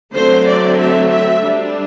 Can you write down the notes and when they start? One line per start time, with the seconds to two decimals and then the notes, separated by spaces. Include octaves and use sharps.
0.14 D3 F#3 A3 C4 C5
0.46 D5
0.78 E5
1.10 E5
1.42 G3 D4